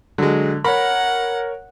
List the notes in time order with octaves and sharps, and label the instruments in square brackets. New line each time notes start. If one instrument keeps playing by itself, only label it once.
[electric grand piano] D3 [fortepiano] F#3 G#3
[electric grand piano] A#4 C#5 [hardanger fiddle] F#5 [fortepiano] B5